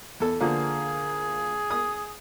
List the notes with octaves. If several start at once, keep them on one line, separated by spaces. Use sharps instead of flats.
E2 A4
D3 F3 A#3 G#4
D#6